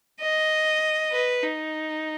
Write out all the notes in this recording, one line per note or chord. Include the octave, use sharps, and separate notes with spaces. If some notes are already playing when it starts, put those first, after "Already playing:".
D#5
B4
D#4